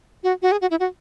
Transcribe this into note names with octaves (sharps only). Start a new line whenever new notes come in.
F#4
F#4
G#4
F#4
E4
F#4